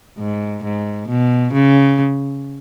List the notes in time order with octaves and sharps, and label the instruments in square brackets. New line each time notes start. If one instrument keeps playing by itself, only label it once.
[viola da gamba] G#2
G#2
B2
C#3